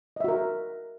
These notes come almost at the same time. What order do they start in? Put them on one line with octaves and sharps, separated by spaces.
D#5 E5 F#4 A#4